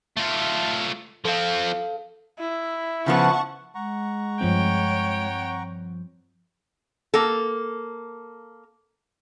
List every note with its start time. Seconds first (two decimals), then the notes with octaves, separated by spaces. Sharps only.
0.17 A3 F4
1.25 F3 C4 A4 F5
2.39 E4
3.06 C#3 F3 B3 F#5 A5 C#6
3.75 G#3 F#5 A#5 C#6
4.41 G2 F3 C4 C#5 G5
7.14 A#3 A4